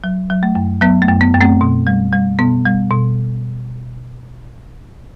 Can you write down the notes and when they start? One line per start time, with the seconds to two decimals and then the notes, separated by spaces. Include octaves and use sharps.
0.04 F#3
0.30 F#3
0.43 A3
0.55 F#2
0.81 F#3 B3
1.02 A3
1.08 F#2
1.21 B3
1.34 F#2
1.41 A3 C4
1.61 B2
1.87 G3
2.12 G3
2.39 B2 B3
2.66 G3
2.91 B2